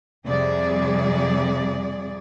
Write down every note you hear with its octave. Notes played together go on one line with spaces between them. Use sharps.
F2 C3 G3 G#4 D5